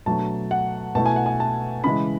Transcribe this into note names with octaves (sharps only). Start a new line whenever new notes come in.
B2 F#3 A3 D4 A5
F#5
B2 A3 E4 A5
G#5
F#5
G#5
A5
C#3 E3 G#3 B5